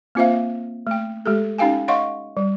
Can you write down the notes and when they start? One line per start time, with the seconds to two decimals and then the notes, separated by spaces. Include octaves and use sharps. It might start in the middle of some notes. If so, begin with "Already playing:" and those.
0.15 A#3 C4 F4 C5 E5 F5
0.87 A3 G5
1.26 G#3 G4 A4
1.58 C#4 D#4 G4 F5 G5 G#5
1.88 C#5 D#5 F5 F#5 C6 C#6
2.37 G3